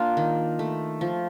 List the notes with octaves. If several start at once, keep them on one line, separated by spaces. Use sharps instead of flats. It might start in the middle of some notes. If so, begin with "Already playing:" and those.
Already playing: A#3 D4 F4
D#3
A3
F3